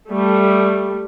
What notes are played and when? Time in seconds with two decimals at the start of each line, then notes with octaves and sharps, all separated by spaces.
0.10 G3 A3